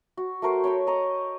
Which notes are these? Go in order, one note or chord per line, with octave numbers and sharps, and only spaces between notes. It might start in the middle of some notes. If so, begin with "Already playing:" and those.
F#4
A3 F#4 A#4 C5
C#5 G5 B5 C#6
D#5 A#5 C#6